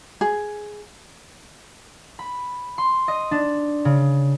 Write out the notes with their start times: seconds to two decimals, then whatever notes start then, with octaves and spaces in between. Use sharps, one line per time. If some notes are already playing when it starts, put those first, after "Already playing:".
0.21 G#4
2.19 B5
2.78 C6
3.08 D#5
3.31 D4
3.85 C#3